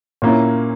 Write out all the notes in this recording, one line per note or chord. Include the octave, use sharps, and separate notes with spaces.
A#2 A#3 C#4 E4